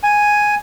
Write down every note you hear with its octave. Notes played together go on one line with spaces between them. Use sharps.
G#5